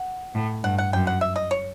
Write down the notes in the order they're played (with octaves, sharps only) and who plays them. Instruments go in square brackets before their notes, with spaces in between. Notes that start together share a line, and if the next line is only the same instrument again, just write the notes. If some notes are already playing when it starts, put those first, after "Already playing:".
Already playing: [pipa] F#5
[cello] A2
[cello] G2 [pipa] F#5
[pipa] F#5
[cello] F#2 [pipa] G5
[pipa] F#5
E5
D#5
C#5